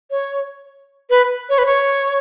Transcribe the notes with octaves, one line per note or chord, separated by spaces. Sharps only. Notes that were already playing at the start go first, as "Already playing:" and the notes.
C#5
B4
C#5
B4
C#5